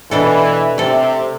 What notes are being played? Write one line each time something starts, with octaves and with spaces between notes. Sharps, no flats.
B2 E3 D4 A4
C3 A3 A4